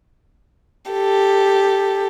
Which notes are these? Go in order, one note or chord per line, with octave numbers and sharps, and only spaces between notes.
G4 A4